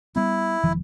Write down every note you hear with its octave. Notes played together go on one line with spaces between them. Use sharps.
G3 B3 E4
E1 D#3 F3